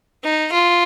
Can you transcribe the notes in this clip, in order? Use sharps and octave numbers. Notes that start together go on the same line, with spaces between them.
D#4
F4